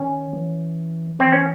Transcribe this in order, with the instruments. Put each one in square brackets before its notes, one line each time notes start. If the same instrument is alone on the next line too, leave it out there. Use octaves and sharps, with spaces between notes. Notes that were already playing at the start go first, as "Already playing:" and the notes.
Already playing: [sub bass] D#3 [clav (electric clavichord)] C#4
[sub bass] E3
[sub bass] E3 [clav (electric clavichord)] C4
[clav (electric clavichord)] C#4